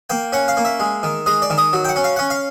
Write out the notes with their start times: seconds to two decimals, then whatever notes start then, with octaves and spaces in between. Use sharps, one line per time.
0.10 A#3 G5
0.33 C#4 F#5
0.48 F5
0.57 A#3
0.65 E5
0.80 G#3
1.03 D#3
1.26 G#3 D#5
1.42 D5
1.50 D#3
1.58 D#5
1.73 F#3
1.85 G5
1.89 F#5
1.96 C#4
2.04 F5
2.16 C#4 F#5
2.30 F5